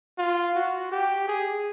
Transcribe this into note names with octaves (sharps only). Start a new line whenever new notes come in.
F4
F#4
G4
G#4